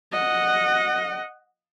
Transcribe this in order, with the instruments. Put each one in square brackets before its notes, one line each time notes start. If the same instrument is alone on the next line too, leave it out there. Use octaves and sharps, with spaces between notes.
[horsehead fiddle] D#5 F#5